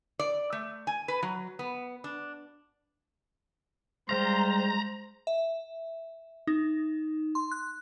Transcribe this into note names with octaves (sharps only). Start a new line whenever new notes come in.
D5
A3
G#5
B4
F#3
B3
D4
G3 G#3 C5 F5 A#5 C6
E5
D#4
C6
F#6